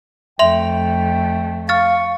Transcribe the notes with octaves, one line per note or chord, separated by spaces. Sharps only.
F2 A3 E5 G5 C6 F7
F5 C#6 F6 A6